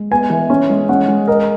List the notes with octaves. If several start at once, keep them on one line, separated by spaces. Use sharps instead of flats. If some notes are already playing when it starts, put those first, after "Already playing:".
Already playing: G#3
B3 G#5
E3
C#4
G#3
C#4 F#5
G#3
A#4 D#5